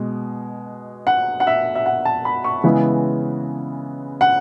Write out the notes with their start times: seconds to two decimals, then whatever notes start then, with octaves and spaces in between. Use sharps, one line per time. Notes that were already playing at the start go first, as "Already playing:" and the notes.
Already playing: B2 G#3
1.07 F#5
1.40 F#5
1.47 E5
1.75 E5
1.86 F#5
2.05 A5
2.25 B5
2.44 C#6
2.64 C#3 E3 G#3 B3 E4
4.21 F#5